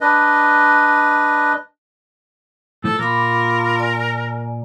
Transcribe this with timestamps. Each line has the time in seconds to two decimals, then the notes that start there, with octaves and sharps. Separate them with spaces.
0.01 D4 B4 D#5
2.84 A2 F3 A4
2.99 A#2 F4 A#4 B5 D6
3.79 D5 G#5 A#5